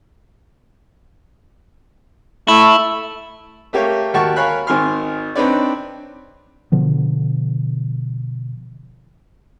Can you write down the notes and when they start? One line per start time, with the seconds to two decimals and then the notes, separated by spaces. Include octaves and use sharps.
2.48 A3 E4
3.73 A3 A#3 G4 C#5 F5
4.14 D#2 F#4 G4 A#4 A5 C#6
4.36 A#4 C#5 F5 G#5 B5 F#6
4.67 G#1 D#3 G#5 C6 F6
5.36 C4 D4 D#4 B4 C#5 D5
6.72 B2 D3 F3 B3